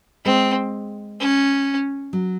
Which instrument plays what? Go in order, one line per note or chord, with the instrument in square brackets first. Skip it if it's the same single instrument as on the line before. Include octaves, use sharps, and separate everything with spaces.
[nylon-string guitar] G#3 [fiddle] C4
[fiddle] C#4
[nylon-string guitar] F#3